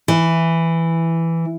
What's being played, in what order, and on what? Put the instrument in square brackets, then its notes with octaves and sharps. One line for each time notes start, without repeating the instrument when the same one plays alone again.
[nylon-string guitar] E3